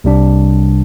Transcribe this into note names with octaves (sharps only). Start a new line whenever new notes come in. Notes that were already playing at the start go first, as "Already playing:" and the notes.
C2 C3 G3 D4